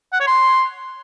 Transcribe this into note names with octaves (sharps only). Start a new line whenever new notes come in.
F#5
C#5
C6